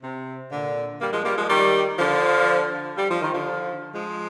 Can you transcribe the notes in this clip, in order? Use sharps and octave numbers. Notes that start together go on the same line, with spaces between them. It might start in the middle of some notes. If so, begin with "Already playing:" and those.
C3
A#2 D3
G3 A#3
F3 G#3
G3 A#3
F3 G#3
D#3 G3
D3 F3
G3
F3
D#3
D3 F3
F3 G#3